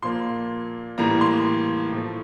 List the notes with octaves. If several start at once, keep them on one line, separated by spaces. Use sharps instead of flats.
A#2 F3 A#3 C6
A2 E3 G3 A#3 A#5
C6
A2 F3 A3